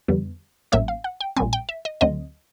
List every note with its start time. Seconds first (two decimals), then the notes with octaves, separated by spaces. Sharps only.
0.08 F2 D3 G3 B3
0.72 A1 A2 F#3 A#3 C#4 E5
0.88 F5
1.04 F#5
1.21 G5
1.36 A#1 A#2 G3 C4 G#5
1.53 G5
1.69 E5
1.85 D#5
2.01 D2 D3 F#3 A3 C4 D#5